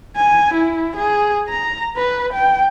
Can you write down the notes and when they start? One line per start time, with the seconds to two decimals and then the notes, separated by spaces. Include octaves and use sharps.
0.17 G#5
0.54 E4
0.96 G#4
1.49 A#5
1.97 B4
2.33 G5